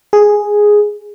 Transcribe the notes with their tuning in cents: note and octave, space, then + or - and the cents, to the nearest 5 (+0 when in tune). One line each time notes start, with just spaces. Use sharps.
G#4 +0